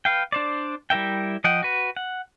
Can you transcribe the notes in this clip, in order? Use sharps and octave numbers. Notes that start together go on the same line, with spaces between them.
B4 F5 G5
D4 C5 D5
G3 E4 A#4 E5 G5
F3 D#5 F#5 G5
F#4 B4
F#5